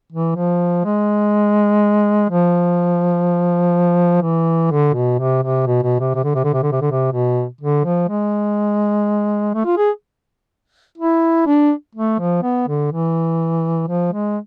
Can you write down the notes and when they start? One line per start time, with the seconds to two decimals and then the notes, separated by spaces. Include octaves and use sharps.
0.12 E3
0.36 F3
0.85 G#3
2.30 F3
4.22 E3
4.71 D3
4.94 B2
5.19 C3
5.43 C3
5.67 B2
5.83 B2
6.00 C3
6.15 C3
6.24 D3
6.35 C3
6.44 D3
6.53 C3
6.63 D3
6.72 C3
6.81 D3
6.91 C3
7.13 B2
7.61 D3
7.85 F3
8.09 G#3
9.54 A3
9.65 F4
9.77 G#4
10.98 E4
11.47 D4
11.95 A3
12.20 F3
12.43 B3
12.68 D3
12.92 E3
13.88 F3
14.12 G#3